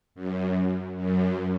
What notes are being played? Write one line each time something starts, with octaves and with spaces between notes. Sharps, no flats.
F#2
F#2